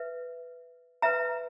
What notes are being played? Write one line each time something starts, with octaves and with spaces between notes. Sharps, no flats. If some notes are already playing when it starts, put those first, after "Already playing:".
Already playing: B4 E5
B4 E5 A#5